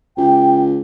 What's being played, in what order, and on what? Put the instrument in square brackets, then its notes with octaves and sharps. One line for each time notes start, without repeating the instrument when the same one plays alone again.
[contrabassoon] C#2 [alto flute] G5